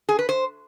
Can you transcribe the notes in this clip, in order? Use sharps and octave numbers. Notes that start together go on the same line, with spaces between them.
G#4
B4
C5